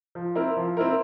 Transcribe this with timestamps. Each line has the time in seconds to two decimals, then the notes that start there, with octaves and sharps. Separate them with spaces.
0.15 F3
0.35 C4 E4 A#4
0.56 F3
0.77 C4 E4 A#4